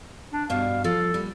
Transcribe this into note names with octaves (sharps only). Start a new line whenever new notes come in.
D4
G2 B2 D4 F5
F3 A4
A#2 G3